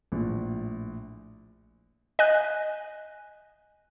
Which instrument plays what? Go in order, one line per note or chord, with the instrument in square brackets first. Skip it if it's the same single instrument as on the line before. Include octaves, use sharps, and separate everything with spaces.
[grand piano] A#1 A2
[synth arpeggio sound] D#5 G#5 F#6